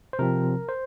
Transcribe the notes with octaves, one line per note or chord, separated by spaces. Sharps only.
C5
C3 F3 C4 A#4
C5